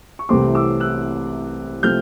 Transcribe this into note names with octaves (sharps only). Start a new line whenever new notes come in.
C#6
C2 C3 E3 A3 C4 C6 D6
D6 E6
E6 F#6
C3 F3 A3 C4 F6 G6